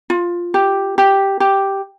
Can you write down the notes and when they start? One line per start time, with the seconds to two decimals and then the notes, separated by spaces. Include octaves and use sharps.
0.10 F4
0.54 G4
0.98 G4
1.40 G4